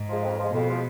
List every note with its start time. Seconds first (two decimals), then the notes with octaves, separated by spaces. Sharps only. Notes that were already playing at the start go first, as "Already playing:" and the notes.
Already playing: G#2
0.09 F3 G#3
0.24 F2
0.38 F3 G#3
0.54 F2 B2
0.69 F3 G#3